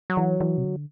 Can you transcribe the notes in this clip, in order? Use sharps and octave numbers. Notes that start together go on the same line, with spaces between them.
F#3
E3
E3
C3
D3